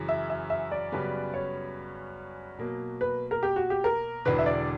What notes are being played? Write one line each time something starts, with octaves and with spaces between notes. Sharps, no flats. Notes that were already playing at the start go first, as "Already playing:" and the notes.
Already playing: F#2 C#3 E3
E5
E5
E5
D5
F#2 C#3 G3 B3
C#5
B2 F#3 A#3
B4
A#4
G4
F#4
G4
A#4
E1 E2 D3 B4
E5
D5